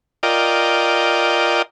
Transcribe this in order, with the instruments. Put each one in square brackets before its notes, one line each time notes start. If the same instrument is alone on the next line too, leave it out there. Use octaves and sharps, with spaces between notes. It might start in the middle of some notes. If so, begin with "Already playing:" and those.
[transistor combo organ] F4 A#4 D5 D#5 G5